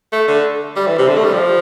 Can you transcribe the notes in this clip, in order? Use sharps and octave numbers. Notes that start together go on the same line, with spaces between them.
A3
D3
G3
E3
C3
D3
A3
G3
F3